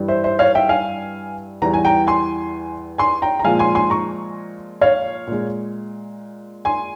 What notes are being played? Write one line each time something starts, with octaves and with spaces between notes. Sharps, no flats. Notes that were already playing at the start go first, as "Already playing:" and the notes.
Already playing: G2 E3 G3
C5 E5
C5 E5
C#5 F5
E5 G5
F5 G#5
E2 E3 G3 A#5
G#5
G5 A#5
G#5 C6
G#5 C6
G5 A#5
A#5
A#2 F3 G#3 F5 G#5
G#5 C6
G#5 C6
A#5 C#6
C#5 F5
A#2 G#3
G#5 C6